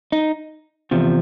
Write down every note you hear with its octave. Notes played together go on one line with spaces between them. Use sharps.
D#4
E2 C3 F3